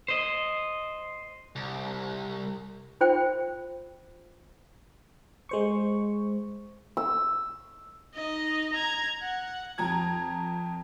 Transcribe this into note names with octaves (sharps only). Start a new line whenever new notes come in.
C5 D#5
C2
F4 C5 G5
G#3 C5 C#6
E6
D#4 D#5
A#5 G#6
F#5
F2 A#5 G#6